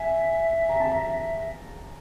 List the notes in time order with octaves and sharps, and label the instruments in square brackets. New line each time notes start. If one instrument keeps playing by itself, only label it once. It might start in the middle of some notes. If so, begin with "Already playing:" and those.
Already playing: [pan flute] E5 [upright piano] G#5
[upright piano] A#5
A5
A#5